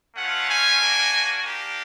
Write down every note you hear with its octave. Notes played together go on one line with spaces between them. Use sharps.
A3 C#4 F4 F#5
G#5
A#3 D4 F#4
A#3 D4 G4